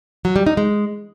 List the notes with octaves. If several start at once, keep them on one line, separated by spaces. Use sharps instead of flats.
F#3
G3
D#4
G#3